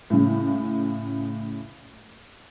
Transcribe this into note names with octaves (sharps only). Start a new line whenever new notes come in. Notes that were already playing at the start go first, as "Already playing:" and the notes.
A2 C#3